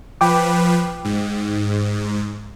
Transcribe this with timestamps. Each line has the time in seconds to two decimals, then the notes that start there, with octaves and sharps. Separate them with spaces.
0.21 F3 B4 G5 D6
1.05 G#2